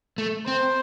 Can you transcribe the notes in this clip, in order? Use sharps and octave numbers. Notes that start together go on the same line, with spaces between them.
A3
C4 C5